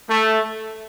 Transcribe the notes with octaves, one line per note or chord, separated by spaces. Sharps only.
A3